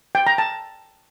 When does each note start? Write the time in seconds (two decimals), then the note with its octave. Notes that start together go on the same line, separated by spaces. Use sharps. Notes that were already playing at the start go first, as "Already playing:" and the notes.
0.15 G5
0.27 A#5
0.38 A5